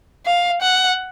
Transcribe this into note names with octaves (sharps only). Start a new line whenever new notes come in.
F5
F#5